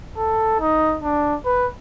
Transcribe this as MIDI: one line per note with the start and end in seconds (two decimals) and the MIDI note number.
0.17 0.58 69
0.60 0.97 63
1.02 1.34 62
1.45 1.67 71